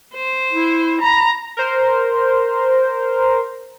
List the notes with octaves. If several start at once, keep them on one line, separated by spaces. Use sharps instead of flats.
C5
E4
A#5 B5
A#4 C5